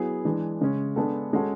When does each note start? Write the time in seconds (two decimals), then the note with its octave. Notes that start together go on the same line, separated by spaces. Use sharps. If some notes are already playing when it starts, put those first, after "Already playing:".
Already playing: F#3 B3 E4 G#4
0.25 E3 G#3 D4
0.61 C#3 G#3 C#4
0.96 G#3 B3 D4 A4
1.33 G#3 C#4 F#4 A4